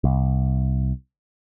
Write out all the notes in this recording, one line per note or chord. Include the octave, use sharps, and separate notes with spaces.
C2